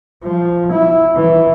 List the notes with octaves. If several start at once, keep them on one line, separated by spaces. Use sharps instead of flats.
F3
E4
E3